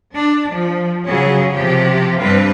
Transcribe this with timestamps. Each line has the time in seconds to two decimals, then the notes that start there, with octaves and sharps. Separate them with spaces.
0.13 D4
0.53 F3
1.08 C#3 F#3 C#4 G#4
1.53 C3 F3 G4
2.18 G2 G3 C4 D4 B4 F5